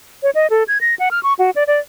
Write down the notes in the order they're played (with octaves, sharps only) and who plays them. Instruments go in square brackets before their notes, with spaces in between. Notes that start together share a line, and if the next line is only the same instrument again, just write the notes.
[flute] C#5
D#5
A4
G#6
A#6
F#5
F6
C#6
F#4
D5
D5